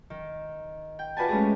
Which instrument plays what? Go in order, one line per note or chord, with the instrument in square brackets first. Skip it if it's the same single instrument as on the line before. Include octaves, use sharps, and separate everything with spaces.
[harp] D#3
G5
F4 F#4 B4 D5 G#5 A5
G#3 A3 C#4 D4 G4 G#4